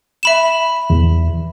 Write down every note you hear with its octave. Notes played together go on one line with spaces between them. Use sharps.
E5 B5 E7
E2